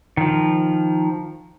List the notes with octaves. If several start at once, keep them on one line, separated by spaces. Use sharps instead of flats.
D#3 F3